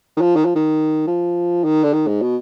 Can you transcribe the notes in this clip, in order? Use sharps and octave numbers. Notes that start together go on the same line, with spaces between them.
D#3
F3
D#3
F3
D#3
F3
D#3
D3
D#3
G#2
B2